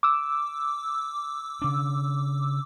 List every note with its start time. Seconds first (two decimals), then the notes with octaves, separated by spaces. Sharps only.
0.03 D6 E6
1.62 C#3 D4